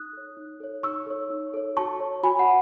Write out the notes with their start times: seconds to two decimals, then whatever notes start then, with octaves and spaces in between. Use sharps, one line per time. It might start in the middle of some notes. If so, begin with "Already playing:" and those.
Already playing: D#4 D#6 F#6
0.13 A4 C#5
0.37 D#4
0.60 A4 C#5
0.83 D#4 C#6 E6
1.07 A4 C#5
1.30 D#4
1.54 A4 C#5
1.77 F#4 A5 C#6
2.00 C#5
2.23 F#4 G#5 B5
2.39 F#5